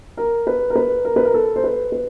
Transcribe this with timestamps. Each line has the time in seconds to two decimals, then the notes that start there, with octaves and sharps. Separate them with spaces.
0.17 A#4
0.47 B4
0.70 A#4
0.75 B4
1.05 A#4
1.16 B4
1.25 A#4
1.34 A4
1.56 C5
1.64 B4
1.92 B4